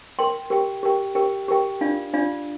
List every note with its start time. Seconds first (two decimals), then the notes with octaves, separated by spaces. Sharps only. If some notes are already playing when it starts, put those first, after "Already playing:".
0.19 A#4 G5 C6
0.50 G4 A#4 G5
0.83 G4 A#4 G5
1.15 G4 A#4 G5
1.48 G4 A#4 G5
1.81 D4 F4 D5 F5
2.14 D4 F4 D5 F5